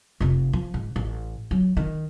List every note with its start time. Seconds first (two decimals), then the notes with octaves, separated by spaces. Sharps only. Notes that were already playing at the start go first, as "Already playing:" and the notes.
0.21 F1 F2
0.53 F3
0.74 G#2
0.96 A1
1.51 F#3
1.77 D#3